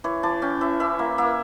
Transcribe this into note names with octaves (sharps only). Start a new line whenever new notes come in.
E3 C#5
E3 A5
C#4 G5
E3 E5
E3 E5
A#3
A#3 E5